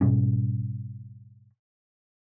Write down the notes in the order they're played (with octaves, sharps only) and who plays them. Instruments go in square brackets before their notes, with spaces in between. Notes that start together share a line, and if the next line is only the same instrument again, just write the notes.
[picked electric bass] G#2 B2 G3 C#4